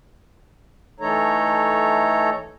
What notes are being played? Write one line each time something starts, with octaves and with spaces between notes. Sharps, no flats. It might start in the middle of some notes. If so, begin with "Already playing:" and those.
E3 A3 D#4 A4 C#5 A#5